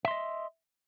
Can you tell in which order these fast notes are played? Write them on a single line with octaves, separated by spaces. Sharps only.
E5 C6 D#5